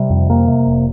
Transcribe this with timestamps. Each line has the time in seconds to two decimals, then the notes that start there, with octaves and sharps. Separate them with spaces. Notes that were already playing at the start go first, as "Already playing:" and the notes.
Already playing: C3 G3
0.10 F2
0.30 C3 A#3
0.48 C3
0.66 F1